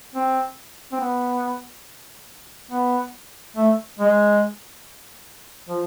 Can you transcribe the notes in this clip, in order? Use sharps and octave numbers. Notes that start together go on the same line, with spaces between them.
C4
C4
B3
B3
A3
G#3
F3